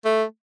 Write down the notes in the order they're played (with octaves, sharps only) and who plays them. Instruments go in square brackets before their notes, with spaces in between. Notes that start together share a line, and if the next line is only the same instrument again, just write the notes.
[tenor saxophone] A3